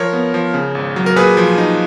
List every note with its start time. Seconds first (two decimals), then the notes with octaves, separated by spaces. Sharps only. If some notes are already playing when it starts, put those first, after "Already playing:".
Already playing: F3 A#4 C#5
0.13 B3
0.34 F3
0.54 C#3
0.75 G#1
0.96 F#3
1.06 A#4
1.16 A#2 G#4 B4
1.37 F3
1.58 D#4